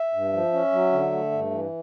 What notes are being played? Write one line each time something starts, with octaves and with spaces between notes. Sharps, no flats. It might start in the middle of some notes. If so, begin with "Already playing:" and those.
Already playing: E5
G2
F3
C#4
F#3
D3
A3
G2
E3